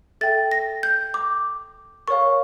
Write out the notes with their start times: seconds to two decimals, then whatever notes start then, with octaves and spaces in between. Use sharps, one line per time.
0.21 A4 E5 G5 A6
0.51 A#6
0.83 G6
1.14 D6
2.08 A#4 C#5 F5 C#6